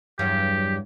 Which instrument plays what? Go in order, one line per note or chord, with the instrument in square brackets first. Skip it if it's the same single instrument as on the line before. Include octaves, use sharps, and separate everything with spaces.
[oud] E2 G2 F#3 [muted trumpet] G4